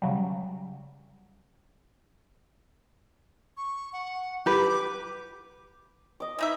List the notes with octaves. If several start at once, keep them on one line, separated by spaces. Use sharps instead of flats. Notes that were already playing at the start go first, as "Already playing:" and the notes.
C#3 F#3 G3
C#6
F#5
G4 B4 D6
D#5 D6
E3 D#4 E5